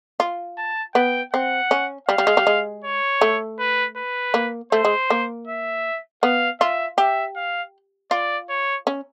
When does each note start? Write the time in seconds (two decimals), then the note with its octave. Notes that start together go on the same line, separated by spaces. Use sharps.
0.20 F4
0.58 A5
0.95 B3 G5
1.33 C4 F#5
1.71 C#4
2.08 G3 F5
2.18 G3
2.27 G#3
2.37 G3
2.47 G#3
2.84 C#5
3.21 A3
3.59 B4
3.96 B4
4.34 A#3
4.72 A3 C5
4.85 G#3
5.10 A#3
5.47 E5
6.23 B3 F5
6.60 F4 E5
6.98 G4 E5
7.36 F5
8.11 F4 D5
8.49 C#5
8.87 C#4